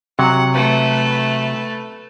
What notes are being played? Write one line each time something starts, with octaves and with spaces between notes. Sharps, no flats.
C3 F#3 F#5
A3 B4